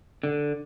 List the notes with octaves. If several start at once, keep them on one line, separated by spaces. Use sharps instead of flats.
D3